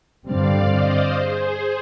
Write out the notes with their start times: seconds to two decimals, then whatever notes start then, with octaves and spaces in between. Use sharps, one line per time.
0.25 G2 D3 G3 C4 D5 F5
0.70 C5 D#5
1.15 G#4 C5